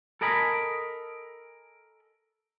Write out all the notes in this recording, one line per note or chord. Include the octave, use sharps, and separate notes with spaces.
A4 A#4 D#5 G#5 B5